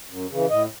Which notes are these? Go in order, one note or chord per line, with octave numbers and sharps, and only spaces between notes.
F#2
C#3 E3
A2 D#5